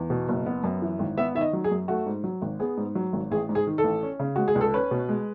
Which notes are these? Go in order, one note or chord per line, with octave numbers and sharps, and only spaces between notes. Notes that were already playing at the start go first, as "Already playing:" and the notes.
Already playing: E2
B2
F#1
B3
F#2
E3
G#1
B3 E5
D#3 E5
D#5
F#3
G#4
F#2
A3 F#4
G#2
F#3
G#1
B3 G#4
G#2
F#3
G#1
A1 G#4
G#2
G#4
D#3
A4
A1
C#4
C#3
G#3 F#4
G#4
C#2
A4
C#4 B4
B2
G#3